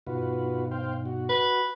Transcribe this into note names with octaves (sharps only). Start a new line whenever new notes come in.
G2 B2 D#4 F4 F#4 B4
C5 F5 G5
F#4
B4